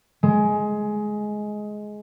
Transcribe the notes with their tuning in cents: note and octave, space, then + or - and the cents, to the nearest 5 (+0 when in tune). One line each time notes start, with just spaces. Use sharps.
G#3 +15